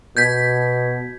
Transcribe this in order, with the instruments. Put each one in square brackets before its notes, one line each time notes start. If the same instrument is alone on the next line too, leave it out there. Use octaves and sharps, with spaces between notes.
[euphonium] B2 [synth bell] G6 G#6 B6